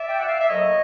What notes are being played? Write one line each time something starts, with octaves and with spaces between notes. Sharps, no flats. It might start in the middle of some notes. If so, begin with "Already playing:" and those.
Already playing: D5 E5
G5
F#5
F5
E5
A2 F#3 A#3 C#5 D#5